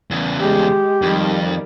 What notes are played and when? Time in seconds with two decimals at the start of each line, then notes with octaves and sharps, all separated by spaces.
0.11 E2 C#3
0.40 G#3 G4
1.02 F2 D#3 G3